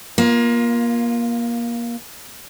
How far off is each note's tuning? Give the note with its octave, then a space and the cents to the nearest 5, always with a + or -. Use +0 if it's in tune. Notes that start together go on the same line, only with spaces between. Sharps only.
A#3 +25 F4 +0